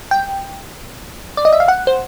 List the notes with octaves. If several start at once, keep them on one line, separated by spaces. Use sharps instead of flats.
G5
D5
D#5
E5
F5
F#5
C5